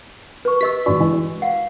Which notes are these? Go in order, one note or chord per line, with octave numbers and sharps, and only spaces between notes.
B4 C#6
G4 D#5 E6 B6
A1 G2 D4 F#4 C#6
E3 G#3
F5 F#5